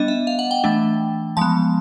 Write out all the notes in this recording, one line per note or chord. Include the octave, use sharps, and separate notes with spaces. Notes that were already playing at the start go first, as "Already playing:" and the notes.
Already playing: G3 B3 D4 D#5
E5
F5
F#5
G5
E3 A3 D4
F3 G#3 B3 A5